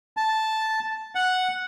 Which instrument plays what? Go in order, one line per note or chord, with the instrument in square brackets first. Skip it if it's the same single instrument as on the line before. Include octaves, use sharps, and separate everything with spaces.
[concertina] A5
F#5